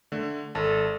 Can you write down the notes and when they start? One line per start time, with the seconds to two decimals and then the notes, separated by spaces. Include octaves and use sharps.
0.12 D3 A3
0.55 G#1 A4 A5